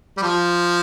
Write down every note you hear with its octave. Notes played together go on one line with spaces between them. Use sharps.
G3
F3